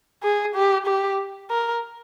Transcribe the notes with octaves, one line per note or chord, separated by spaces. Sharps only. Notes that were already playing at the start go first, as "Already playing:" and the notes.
G#4
G4
G4
A#4